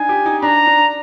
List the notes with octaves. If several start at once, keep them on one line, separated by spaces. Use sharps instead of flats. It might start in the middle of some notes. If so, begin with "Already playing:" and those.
Already playing: D4 D#4 G#5
G4
D#4
D4 A#5
D4